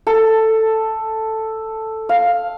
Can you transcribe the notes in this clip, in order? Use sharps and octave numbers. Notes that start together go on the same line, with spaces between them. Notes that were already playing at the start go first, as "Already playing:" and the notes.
A4
F5